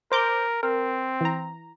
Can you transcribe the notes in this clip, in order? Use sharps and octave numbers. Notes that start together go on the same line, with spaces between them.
A#4 C5 D6 G6
C4 A#4
E3 A#5